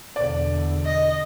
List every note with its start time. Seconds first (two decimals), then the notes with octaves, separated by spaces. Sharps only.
0.16 E2 B2 D3 D5
0.86 D#5